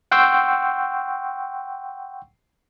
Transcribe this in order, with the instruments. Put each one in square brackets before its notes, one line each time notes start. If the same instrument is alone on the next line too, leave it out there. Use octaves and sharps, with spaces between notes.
[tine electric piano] F#5 G5 C6 C#6 E6